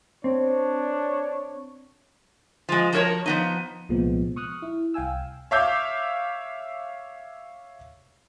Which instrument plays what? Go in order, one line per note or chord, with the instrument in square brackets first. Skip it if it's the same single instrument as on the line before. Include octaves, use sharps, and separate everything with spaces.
[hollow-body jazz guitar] C4 [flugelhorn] D4 [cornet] C#5
[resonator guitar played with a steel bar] F3 G#3
F3 F#4 A#4 C#5
F3 B3 D#4
[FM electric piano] C2 A#2 F3 G#3 B3
C#6 D#6 F6 F#6
E4
C2 F5 G5 G#5 E6
[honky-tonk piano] C#5 E5 F5 D6 G6